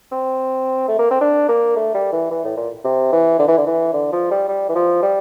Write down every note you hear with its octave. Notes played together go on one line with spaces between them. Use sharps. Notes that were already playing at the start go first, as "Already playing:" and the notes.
C4
A3
A#3
C4
D4
A#3
A3
G3
E3
E3
A2
A#2
C3
E3
D3
E3
D3
E3
D3
F3
G3
G3
E3
F3
G3